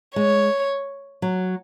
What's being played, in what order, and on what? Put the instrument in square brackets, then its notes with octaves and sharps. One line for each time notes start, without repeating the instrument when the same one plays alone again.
[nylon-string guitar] G#3 [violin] C#5
[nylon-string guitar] F#3